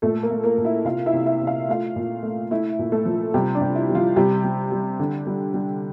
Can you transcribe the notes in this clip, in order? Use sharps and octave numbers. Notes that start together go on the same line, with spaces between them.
A#2 A3 A4
A#3 A#4
A3
A#3 A#4
A#2
E4 E5
C3 F4 F5
E4 E5
C3
E4 E5
C3
F5
A3 F4 F5
A#2
A3
A3 E4 E5
A#2
A3 A4
F3
C3 G3 G4
D4
C3
E4
G3
F3 F4
C3 G3 G4
G3
G3
D3
G3
G3